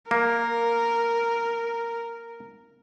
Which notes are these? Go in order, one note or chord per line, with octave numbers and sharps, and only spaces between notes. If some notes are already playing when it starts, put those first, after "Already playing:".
A#3 A#4